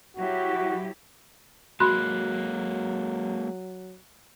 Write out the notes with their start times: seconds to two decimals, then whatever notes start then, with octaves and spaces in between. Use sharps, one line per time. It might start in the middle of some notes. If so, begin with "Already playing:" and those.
0.17 F#3 E4 F#4 G4
1.80 F#3 G#3 A#3 F#4 B5 C6 F#6